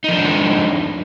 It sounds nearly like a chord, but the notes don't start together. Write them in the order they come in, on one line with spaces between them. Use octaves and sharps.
D#4 F3 D4 G#3